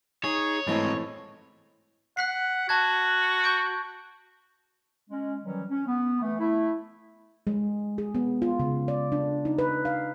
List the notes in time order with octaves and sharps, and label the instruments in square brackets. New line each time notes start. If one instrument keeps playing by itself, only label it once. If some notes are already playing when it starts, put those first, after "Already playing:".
[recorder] D#4 [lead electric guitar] G#4 [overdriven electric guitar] C#5
[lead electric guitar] G#2 C4 [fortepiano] E3 A3 [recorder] D#5
[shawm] F#5 [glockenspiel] F#6 B6 C7
[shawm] F#4 [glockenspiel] A5 F#6 G#6
[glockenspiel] C#6 G6 D7
[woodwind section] G#3 C#4
D#3 E3 F#3 G3 C#4
C#4
B3
E3 A3
A3 E4
[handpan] G#3
G#4
B3
F4
C#3
D5
D4
D#4
B4
F5